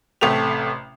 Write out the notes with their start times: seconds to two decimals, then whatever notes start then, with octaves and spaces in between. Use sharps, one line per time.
0.21 A1 C3 A3 G4 F7